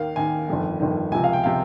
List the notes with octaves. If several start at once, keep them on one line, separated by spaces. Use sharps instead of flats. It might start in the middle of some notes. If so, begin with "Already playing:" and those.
Already playing: D#2 D#3 F5
D#2 D#3 G#5
G1 F2 D#3
G1 F2 D#3
C#2 C3 F3 G#5
F5
G5
C3 F3 F5